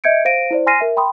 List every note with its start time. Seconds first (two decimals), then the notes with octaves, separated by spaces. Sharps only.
0.04 D#5 E5 G6 G#6 C#7 D7
0.25 C5 F5 A#6 D7 D#7
0.51 E4 C5 D5
0.66 G#5 C6 F6 A#6 C7 D#7
0.81 A#4 E5
0.96 G5 B5 C6 D#6